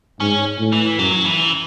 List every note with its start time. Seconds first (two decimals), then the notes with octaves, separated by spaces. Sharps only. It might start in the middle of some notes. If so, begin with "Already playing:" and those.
0.20 G#2 C#4
0.59 A2
0.72 E3
0.99 F#2 F#3
1.26 E3